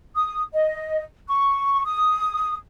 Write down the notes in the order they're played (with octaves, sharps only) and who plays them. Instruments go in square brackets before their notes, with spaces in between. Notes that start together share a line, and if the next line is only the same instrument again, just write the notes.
[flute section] D#6
D#5
C#6
D#6